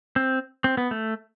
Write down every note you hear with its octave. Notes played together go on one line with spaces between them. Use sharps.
C4
C4
B3
A3